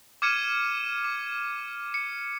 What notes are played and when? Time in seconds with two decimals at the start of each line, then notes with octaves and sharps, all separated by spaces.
0.22 D6 F6 G#6 C#7 D#7 E7
1.04 D6
1.94 C#7